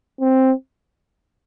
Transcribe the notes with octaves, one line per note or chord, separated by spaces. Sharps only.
C4